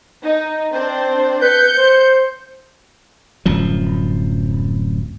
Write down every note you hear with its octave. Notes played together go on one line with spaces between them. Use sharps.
D#4
C4 D4 C5
B4 G6 C#7
C5
D1 F#2 F3